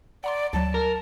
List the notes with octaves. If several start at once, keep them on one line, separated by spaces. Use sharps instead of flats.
D5 F#5 A#5 C6
D2 F#3 A5
A#4